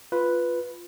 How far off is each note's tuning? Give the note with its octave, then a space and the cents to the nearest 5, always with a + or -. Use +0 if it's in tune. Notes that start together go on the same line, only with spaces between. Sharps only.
F4 +0 B4 +0